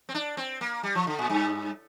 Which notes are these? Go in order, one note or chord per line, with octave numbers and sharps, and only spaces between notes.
C4
D4
C4
A#3
G3
F3
D3
A#2
G2